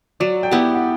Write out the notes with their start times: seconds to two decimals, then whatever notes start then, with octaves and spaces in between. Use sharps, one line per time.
0.20 F#3 D5
0.43 G5
0.51 B3 E4 G4 F#5
0.75 F#5